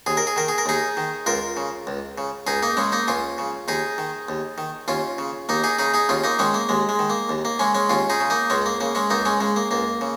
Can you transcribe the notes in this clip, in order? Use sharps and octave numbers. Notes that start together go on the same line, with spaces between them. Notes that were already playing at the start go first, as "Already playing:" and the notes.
D#2 G#4
A#4
G#4
D#3 A#4
G#4
A#4
D#2 D#4 G#4
D#3
C#2 F4 A#4
C#3
C#2
C#3
C#2 D#4 G#4
A#3 D#4
C#3 G#3 C#4
A#3 D#4
C#2 C#4 F4
C#3
D#2 D#4 G#4
D#3
D#2
D#3
D#2 C#4 F4
C#3
D#2 A#3 D#4
D#4 G#4
C#3 D#4 G#4
D#4 G#4
D#2 C#4 F4
A#3 D#4
D#3 G#3 C#4
A#3
D#2 G#3
G#3
D#3
A#3
D#2
A#3
C#3 G#3 C#4
G#3 C#4
D#2 C#4 F4
D#4 G#4
C#3
A#3 D#4
C#2 G#3 C#4
A#3
C#3 A#3
G#3 C#4
C#2 A#3 D#4
G#3 C#4
C#3 G#3
A#3
C#2 A#3
C#3